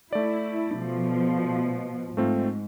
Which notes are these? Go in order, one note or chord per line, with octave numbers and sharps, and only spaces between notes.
A3 E4 D5
B2 F3
G#2 A3 C4 F4